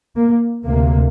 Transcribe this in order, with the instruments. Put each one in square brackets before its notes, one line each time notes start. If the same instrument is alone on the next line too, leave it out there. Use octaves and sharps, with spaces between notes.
[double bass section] A#3
D2 C3 A#3